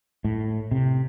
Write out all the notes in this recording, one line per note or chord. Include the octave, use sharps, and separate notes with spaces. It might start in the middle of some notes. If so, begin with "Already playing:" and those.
A2
C3